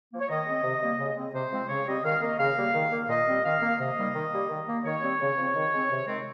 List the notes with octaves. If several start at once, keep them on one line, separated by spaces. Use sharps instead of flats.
F3 A#3
C#5
D#3 D#5
G#3 C4
C3
G3 A#3
C#3
G#3 C4
C3 C5
F3 G#3 C4
C#3 C#5
G3 C4 D#5
D#3 F5
A#3 D#5
C#3 F5
G3 A#3
D#3
A#3
A#2 D#5
G3 C4
D#3 F5
A#3
C3 D#5
D#3 G3 A#3
D#3
G3 A#3
D#3
A#3
D#3 C#5
G3 C4
C#3
F3 C4
D#3
G#3 C4
C3
D#3 G#3 C4